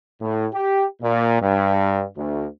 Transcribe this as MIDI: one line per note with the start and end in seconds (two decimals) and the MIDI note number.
0.22 0.47 45
0.54 0.84 67
1.02 1.41 46
1.42 2.05 43
2.17 2.46 38